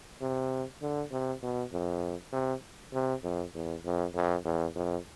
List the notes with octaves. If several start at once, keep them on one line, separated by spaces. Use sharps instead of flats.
C3
D3
C3
B2
F2
C3
C3
F2
E2
F2
F2
E2
F2